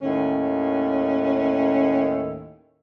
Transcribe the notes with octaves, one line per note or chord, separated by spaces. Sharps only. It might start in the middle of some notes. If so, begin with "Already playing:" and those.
D#2 A2 D#3 C#4